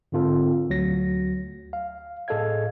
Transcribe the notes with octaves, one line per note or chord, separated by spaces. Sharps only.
G#2 D3 C4 F4 A4
D2 F#3 A#6
F5
A2 G#4 A4 D#5 F5 G#6